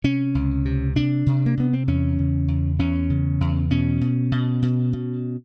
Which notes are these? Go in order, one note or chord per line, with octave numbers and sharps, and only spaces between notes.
C3 C#4
C#2
C3
C3 D4
C3
A#3
C3 B3
C4
E2 C#4
C#3
E2
E2 C#4
C#3
E2
B2 C#4
B2
B2
B2
B2